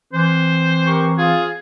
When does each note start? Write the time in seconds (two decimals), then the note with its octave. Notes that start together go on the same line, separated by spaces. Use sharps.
0.13 E3 C4 C5
0.85 G4 A#4 C#6
1.18 F4 G#4